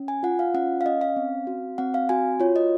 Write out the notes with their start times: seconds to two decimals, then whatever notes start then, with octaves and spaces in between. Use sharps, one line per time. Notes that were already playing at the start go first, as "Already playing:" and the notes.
Already playing: C#4
0.08 G#5
0.23 F4 F#5
0.39 F5
0.54 C#4 F#5
0.81 F5
0.86 C#4 D#5
1.01 F5
1.16 C4
1.47 F#4
1.78 C4 F#5
1.94 F5
2.09 F#4 G#5
2.40 F4 C#5
2.56 D#5